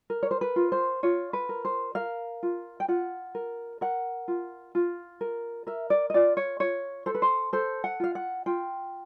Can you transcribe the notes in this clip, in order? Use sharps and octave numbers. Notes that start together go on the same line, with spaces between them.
A#4
C#5
C5
B4
F4
C5
F4 C#5
B4
A#4
C5
A#4 F5
F4
G5
F4 F#5
A#4
A#4 F#5
F4
F4
A#4
A#4 E5
D5
D#5
F4 D5
C#5
F4 C#5
A4 C5
B4
C5
A4 C5
F#5
F4 F5
F#5
F4 G5